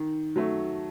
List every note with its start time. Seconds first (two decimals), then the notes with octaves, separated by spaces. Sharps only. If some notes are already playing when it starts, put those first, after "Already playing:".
Already playing: D#3
0.36 F#3 A3